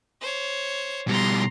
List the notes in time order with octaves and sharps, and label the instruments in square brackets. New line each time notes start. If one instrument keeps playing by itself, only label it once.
[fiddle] C5 C#5
[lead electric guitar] B2 G3 [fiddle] A#5 C6